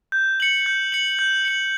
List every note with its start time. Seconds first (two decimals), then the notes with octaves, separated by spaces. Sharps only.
0.12 G6
0.40 C#7 F#7
0.66 G6
0.92 C#7 F#7
1.19 G6
1.45 C#7 F#7